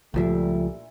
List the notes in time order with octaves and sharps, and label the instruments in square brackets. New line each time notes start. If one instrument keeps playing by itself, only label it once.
[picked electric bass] C#2 F3 [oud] A#2 D4 E4 [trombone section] G3 A3